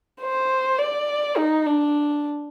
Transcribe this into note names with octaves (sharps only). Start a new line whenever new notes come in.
C5
D5
D#4
D4